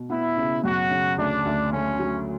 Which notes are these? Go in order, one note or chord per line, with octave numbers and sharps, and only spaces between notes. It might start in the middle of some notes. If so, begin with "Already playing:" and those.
Already playing: B2
B3 E4
C#3
F#2 F#4
C#3
D2 D4
D2
D3 C#4
F#3